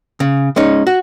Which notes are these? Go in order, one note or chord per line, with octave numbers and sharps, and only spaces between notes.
C#3
G#3 C#4 D#4
F#4